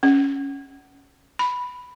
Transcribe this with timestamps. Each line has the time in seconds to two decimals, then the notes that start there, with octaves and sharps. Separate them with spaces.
0.03 C#4
1.39 B5